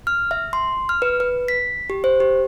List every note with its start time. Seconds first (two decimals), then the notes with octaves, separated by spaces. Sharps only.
0.07 F6
0.31 E5
0.53 C6
0.89 F6
1.02 B4
1.20 B4
1.48 B6
1.90 G4
2.04 C5
2.20 G4